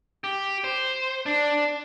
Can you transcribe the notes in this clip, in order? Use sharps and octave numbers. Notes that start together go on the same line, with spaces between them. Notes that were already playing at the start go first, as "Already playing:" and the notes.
G4
C5
D4